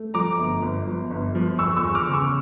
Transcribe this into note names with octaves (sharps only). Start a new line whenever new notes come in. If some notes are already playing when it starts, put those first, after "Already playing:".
Already playing: A3
F3 A#5 D6
G1
G1
F3
G1
F3
E2 C#6 E6
C#6 E6
E2
D6 F6
C#3
C#6 E6